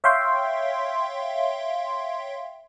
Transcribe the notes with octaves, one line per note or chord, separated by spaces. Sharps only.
C#5 E5 F5 G5 C6